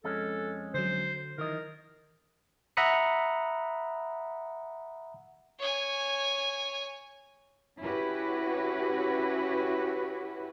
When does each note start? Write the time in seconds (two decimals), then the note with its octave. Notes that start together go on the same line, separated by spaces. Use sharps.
0.04 F2 G#3 C#4 A4
0.74 D3 F#3 C5
1.38 D#3 E3 A#4 D#5
2.77 E5 F#5 A#5 B5 D#6 C#7
5.59 C#5 G#5
7.79 C#4 E4 F#4 G4 B4